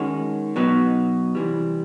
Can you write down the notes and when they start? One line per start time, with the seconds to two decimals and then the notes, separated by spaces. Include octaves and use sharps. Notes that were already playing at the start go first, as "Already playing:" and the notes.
Already playing: D#3 G#3 C#4 F#4
0.56 B2 F#3 B3 D#4
1.35 C3 E3 G3